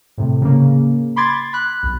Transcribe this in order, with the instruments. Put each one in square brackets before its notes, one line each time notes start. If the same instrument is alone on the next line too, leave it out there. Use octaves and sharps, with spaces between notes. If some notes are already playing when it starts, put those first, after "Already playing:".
[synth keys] A2 C3
C#3 A#3
B5 C6 D6 G#6 A6
B5 F#6
B1